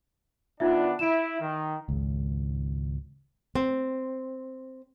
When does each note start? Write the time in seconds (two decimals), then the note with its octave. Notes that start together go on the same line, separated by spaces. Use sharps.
0.60 D#3 B3 D4 D#4 F4 E5
0.99 E4 D7 E7
1.40 D#3
1.89 G#1 C#2
3.55 C4